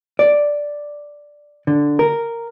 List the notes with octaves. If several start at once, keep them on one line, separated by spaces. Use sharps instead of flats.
D5
D3
A#4